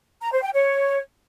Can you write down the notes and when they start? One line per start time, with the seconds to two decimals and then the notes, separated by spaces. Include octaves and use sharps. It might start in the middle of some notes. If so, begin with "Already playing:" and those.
0.22 A#5
0.32 C5
0.43 G5
0.53 C#5